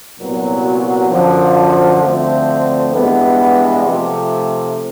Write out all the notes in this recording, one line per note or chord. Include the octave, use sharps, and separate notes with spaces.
C2 A#2 F#3 B3
F#2 D3 F3
D2 D3 F3 A3 C4
G2 E3 G#3 B3
C3 F3 A3